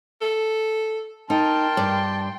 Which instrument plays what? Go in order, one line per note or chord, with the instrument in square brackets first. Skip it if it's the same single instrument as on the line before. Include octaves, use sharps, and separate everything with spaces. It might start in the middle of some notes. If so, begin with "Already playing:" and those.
[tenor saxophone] A4
[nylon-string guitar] D#4 [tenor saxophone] A#4 [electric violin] G5 C6 [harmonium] A5
[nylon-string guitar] G2 D5